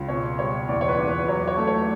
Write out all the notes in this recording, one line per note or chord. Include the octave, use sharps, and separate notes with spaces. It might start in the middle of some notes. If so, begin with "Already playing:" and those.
Already playing: C#2
B2 C#5
G3 C#5
E2 D5
C#5
B4
E2
B4
F#3 C#5
C#5
A3
C#5